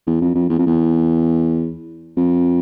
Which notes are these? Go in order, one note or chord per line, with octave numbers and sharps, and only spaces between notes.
E2
F2
F2
E2
F2
E2
F2